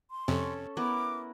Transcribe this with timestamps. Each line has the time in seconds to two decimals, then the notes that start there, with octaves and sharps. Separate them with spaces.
0.11 C6
0.28 F2 C3 C#4 A4
0.77 B3 E4 A#4 D6